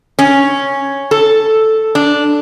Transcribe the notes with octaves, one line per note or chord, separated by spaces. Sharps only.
C#4
A4
D4